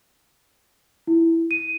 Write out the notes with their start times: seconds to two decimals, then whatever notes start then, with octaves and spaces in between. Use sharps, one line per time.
1.07 E4
1.51 D#7